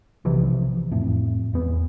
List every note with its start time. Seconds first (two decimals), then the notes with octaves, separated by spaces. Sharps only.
0.25 B1 C3 E3 F3
0.91 F2 A2
1.53 E2 B3